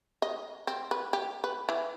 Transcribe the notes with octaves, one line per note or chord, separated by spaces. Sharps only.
D#5
C4
B4
G4
B4
E3